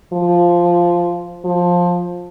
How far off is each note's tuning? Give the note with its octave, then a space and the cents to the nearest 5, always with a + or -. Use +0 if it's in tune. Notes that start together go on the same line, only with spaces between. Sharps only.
F3 -5
F3 +15